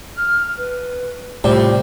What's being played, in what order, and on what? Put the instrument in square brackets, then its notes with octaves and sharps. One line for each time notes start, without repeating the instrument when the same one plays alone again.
[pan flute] F6
B4
[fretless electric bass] A2 [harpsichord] C3 [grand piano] G3 [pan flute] F4